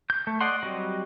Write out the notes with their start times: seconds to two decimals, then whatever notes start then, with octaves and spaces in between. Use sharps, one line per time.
0.10 G6
0.27 A3
0.41 D5 D#5 F#5 C6
0.62 F#3 G3 C4 F#4 D#5